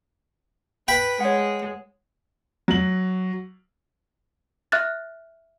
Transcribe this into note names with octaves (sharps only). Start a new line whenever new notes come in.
B4 G5 B5
G#3 C#5 F#5
F#3 F#7
E5 F6 F#6 A6